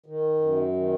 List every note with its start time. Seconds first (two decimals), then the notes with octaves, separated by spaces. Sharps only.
0.06 D#3
0.41 F#2
0.76 D#3